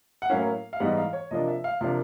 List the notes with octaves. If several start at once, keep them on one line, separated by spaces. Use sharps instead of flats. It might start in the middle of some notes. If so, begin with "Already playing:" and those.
F#5
A2 F#3 A#3 C#4 E4 F5
F5
G#2 E3 G3 B3 D#4 F#5
F5
C#5
C3 F3 A#3 D4 D#5
E5
F5
C3 F3 A#3 D4 F5